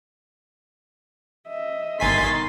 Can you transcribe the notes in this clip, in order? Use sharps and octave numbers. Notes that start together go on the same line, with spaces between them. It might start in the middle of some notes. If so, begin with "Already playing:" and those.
D#5 E5
G1 B2 D#3 D#4 G#5 C6 A6 B6